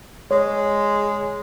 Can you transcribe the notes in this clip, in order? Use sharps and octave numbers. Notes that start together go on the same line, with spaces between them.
G#3 C#5